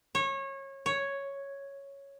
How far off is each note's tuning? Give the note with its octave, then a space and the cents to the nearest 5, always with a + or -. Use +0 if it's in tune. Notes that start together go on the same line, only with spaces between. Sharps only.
C#5 -25
C#5 +0